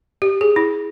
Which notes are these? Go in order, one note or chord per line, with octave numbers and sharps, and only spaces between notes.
G4
G#4
E4